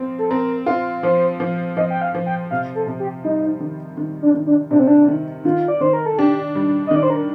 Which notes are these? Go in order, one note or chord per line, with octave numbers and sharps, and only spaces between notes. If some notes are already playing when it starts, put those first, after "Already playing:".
Already playing: F3 C4
A4
C4 A#4
F4
F3 C5
F3
F3 D#5
G5
F5
F3
G5
C3 F5
A4
C3
G4
G3 D#4
D#3
D#3
D4
D#3
D4
C3 D4
C4
D4
D#3
D#3 F4
D5
D#3 C5
A#4
A4
D4 G4
G3
D#5
D#3 D5
C5
A#4